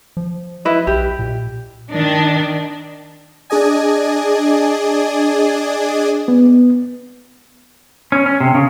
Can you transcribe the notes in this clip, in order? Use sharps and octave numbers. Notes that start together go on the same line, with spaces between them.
F3
E4 B4 D#5
B1 G4
A#2
D#3 D4
D4 G#4 D5 D#5 G#5
B3
C#4
C#4
C3
C#3